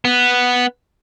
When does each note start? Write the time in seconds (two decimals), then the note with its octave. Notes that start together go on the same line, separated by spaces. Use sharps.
0.05 B3